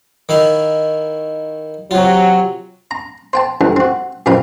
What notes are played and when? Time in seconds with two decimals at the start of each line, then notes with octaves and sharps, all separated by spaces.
0.29 D#3 E4 F5
1.91 C3 F#3 F4
2.91 A#5
3.33 C5 G5 A5
3.61 D2 G2 E3
3.76 C4 F#4
4.26 F#2 B2 C4 F4 A#4 B5